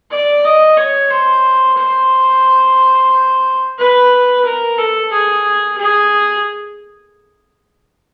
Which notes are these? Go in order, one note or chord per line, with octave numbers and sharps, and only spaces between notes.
D5
D#5
C#5
C5
C5
B4
A#4
A4
G#4
G#4